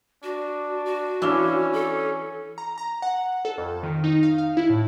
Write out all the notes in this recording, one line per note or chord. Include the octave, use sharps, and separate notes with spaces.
D4 F#4
F#4
E3 C#4 D4 F5 E6 G7
A4
A#5
A#5
F#5
A4
F2
D#3
D#4
F5
F5
E4
A2